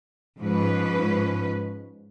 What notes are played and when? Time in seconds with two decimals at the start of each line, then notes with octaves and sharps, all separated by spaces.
0.39 G#2 F3 C#4 B4